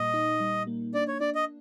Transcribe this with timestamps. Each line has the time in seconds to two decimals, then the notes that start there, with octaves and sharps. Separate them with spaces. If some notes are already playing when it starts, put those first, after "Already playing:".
Already playing: A#2 G3 A#3 D#5
0.14 D#4
0.40 G3
0.67 A#3
0.94 D4 D5
1.08 C#5
1.20 D4 D5
1.35 D#5